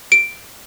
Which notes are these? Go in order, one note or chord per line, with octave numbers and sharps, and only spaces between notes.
D7